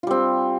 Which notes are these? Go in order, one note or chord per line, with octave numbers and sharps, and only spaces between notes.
G3 C4 F4